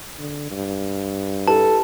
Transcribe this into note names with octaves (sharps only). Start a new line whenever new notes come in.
D3
G2
E4 G4 A4 B4 A5